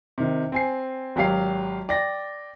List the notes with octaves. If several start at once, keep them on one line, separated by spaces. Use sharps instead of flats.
C3 D#3
C4 G#5 C7
G#1 F#3 G4 F5 C7
D5 G5 A#6